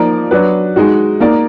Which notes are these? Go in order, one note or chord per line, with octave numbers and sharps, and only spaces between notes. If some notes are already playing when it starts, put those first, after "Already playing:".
Already playing: F3 A#3 D#4 A#4 D5
F#3 D4 F#4 B4
G#3 D#4 F#4
A#3 D#4 A#4 D5